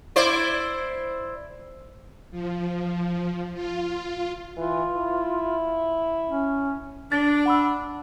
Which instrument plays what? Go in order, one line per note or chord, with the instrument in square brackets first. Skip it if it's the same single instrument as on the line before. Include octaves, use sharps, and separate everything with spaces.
[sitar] E4 C5 D5
[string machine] F3
F4
[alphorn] E3 [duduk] F4
[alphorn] E4
[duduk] C#4
[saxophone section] D4 [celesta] A6
[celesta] F#5 B5 E6